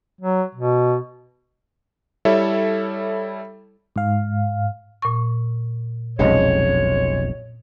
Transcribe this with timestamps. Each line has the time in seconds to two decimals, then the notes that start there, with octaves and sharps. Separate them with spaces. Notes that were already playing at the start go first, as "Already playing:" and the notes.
0.21 F#3
0.55 B2
2.25 G3 E4 A4 C#5 E5
3.96 G#2 F5
5.02 A#2 C#6
6.19 F1 B1 F2 G#3 C#4 D#4 C#5